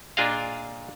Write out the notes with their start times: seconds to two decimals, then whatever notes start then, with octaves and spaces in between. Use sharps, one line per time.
0.17 A#2 D4 F4 G#4 D#5 F5